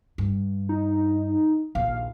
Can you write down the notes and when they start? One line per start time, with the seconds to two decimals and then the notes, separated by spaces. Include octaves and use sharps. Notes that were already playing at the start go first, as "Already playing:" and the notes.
0.18 G2
0.69 D#4
1.75 A#1 D#2 F5